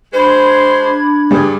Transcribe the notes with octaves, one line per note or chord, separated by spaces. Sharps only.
G#3 D4 F#4 C5 B5 G#6
G2 G3 G#4